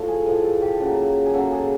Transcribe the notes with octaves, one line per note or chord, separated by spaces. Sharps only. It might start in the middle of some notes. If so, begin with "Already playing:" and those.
Already playing: A2 F3 A3
G#4
A2 F3 A3 G#4
A4
G4
C#3 F#3 A#3
G#4
C#3 F#3 A#3 A4
G#4